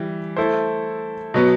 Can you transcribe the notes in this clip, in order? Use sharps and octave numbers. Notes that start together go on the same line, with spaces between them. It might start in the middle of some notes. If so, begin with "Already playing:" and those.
Already playing: E3 G3
A3 E4 A4 C5
B2 F#3 B3